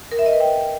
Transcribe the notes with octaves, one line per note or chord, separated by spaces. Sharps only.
A#4
E5
D#5
B4
G5